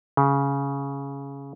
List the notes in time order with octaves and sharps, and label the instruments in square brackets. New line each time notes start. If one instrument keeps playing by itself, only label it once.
[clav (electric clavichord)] C#3